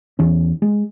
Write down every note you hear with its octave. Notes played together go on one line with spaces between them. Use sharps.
E2 E3 C#4
G#3